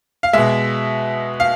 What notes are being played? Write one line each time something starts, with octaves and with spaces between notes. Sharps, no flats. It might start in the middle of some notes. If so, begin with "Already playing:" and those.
F5
B2 G#3 E5
F5